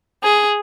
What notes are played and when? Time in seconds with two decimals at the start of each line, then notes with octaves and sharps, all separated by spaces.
0.23 G#4